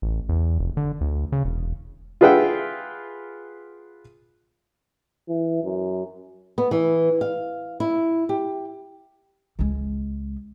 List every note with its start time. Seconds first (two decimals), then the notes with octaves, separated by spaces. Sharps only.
0.02 A1
0.29 E2
0.59 F1
0.77 D3
1.01 D2
1.32 C#3
1.44 E1
2.21 F4 G#4 B4 E5 F#5 G5
5.28 E3
5.64 F#2
6.58 B3
6.71 E3
7.21 F5
7.80 E4
8.29 G4
9.59 C#2 G#3